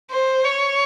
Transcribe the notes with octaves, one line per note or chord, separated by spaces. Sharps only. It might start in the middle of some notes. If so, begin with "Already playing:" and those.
C5
C#5